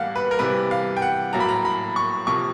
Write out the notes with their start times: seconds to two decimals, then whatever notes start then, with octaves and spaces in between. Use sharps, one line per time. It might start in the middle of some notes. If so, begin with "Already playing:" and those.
Already playing: A2 E3 G3 A#3 F5 F#5
0.16 B4
0.31 A#4
0.39 C3 E3 G3 B4
0.71 F5
0.97 G5
1.02 F#5
1.33 A2 F#3 A#3 A#5
1.40 B5
1.49 A#5
1.65 B5
1.96 C#6
2.27 C3 F3 A#3 C#6